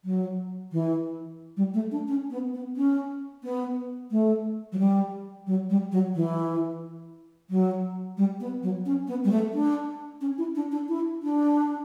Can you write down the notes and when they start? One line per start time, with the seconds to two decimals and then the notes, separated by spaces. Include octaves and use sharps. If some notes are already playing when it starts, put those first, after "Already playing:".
0.05 F#3
0.72 E3
1.57 G3
1.74 A3
1.91 D4
2.08 C#4
2.30 B3
2.54 B3
2.77 C#4
3.43 B3
4.11 A3
4.72 F#3
4.79 G3
5.47 F#3
5.70 G3
5.92 F#3
6.15 E3
7.50 F#3
8.17 G3
8.40 B3
8.63 F#3
8.86 C#4
9.08 B3
9.24 G3
9.31 A3
9.54 D4
10.21 C#4
10.38 E4
10.55 D4
10.72 D4
10.88 E4
11.23 D4